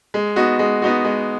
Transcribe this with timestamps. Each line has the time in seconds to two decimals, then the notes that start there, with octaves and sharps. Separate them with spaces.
0.14 G#3
0.36 B3 D#4 F#4
0.59 G#3
0.82 B3 D#4 F#4
1.05 G#3